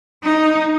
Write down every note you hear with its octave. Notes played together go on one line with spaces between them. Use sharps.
D#4